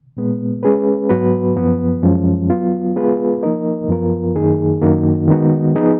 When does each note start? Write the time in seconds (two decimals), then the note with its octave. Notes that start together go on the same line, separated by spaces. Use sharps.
0.17 A#2 G#3 B3
0.63 G#3 C#4 G#4 B4
1.09 G#2 F#3 B3 F#4 B4
1.56 F#2 F3 B3
2.03 F#2 F3 G#3 C#4
2.50 F#3 B3 F4
2.96 G#3 B3 F4 G#4 B4
3.43 F3 A#3 D#4 A#4 D#5
3.88 F#2 F3 B3 F4 A#4
4.35 F#2 D#3 A#3 D#4 G#4
4.82 F#2 D#3 A#3 D#4 F#4
5.28 D#3 G#3 B3 D#4 F#4
5.75 F3 B3 D#4 G#4